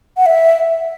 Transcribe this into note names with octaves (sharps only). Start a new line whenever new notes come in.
F#5
E5